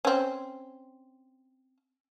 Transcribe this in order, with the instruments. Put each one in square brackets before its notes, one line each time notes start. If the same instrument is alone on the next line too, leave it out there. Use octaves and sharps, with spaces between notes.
[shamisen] C4 C#4